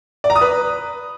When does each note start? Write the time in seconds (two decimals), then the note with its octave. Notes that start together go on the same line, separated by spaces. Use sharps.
0.24 D5
0.30 A#5
0.36 D#6
0.41 B4